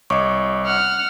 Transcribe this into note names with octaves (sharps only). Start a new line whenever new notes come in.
C2 C#5 D#5 C#6 D6
F#5 F6